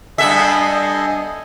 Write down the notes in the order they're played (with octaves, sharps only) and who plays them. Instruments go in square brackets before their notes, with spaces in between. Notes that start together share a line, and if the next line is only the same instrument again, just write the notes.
[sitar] G2 B3 E5 [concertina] A4 D#5 G#5